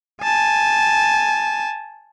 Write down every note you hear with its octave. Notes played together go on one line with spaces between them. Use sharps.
G#5 A5